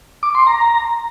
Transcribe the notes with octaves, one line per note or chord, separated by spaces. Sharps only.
D6
C6
A#5